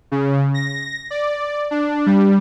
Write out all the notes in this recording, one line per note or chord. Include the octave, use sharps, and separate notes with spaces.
C#3
A#6
D5
D4
G3